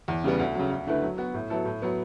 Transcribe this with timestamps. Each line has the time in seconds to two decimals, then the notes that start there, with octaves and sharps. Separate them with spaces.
0.08 E2
0.24 C#3 G3 B3
0.39 D2
0.55 C#3 F#3
0.71 D2
0.87 D3 A3 E4 B4
1.02 F#3
1.18 B3 F#4
1.34 A2
1.50 F#3 B3 E4 A4
1.65 A2
1.82 F#3 B3